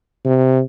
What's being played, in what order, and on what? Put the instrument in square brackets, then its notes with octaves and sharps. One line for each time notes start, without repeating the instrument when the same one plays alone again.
[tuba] C3